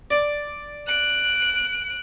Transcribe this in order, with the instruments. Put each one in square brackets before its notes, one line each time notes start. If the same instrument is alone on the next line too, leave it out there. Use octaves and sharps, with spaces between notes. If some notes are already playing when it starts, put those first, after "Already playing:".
[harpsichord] D5
[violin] F#6 D7